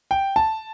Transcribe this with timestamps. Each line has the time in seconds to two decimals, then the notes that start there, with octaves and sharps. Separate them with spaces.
0.11 G5
0.36 A5